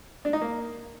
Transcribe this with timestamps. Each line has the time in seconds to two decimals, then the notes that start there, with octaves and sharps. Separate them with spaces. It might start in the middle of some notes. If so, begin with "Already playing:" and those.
0.25 D4
0.33 D#4
0.42 A#3